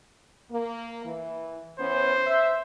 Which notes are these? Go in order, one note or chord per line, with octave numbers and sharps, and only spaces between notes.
A#3
E3
E3 B3 C#4 C5
E5